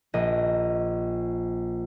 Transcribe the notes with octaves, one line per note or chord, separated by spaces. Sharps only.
A#1 D#5